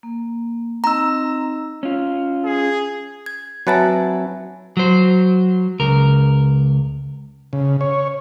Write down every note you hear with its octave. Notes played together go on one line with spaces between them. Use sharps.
A#3
C4 D#4 D#5 A#5 E6
C#4 F4
G#4
G#6
F#3 C4 B4 E5 G#5 A5
F#3 C5
C#2 A#4
C#3
C#5